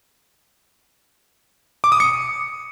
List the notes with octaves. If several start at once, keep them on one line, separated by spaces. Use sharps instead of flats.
D6
D#6
C#7